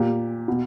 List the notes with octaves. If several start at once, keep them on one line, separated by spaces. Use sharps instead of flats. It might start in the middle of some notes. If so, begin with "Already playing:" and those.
Already playing: A#2 G4
B2